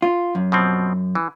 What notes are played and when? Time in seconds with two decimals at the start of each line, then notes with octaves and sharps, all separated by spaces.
0.02 F4
0.35 F#2
0.52 B2 F3 C4
1.15 E3